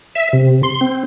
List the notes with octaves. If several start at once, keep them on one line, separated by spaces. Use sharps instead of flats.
E5
C3
C6
C4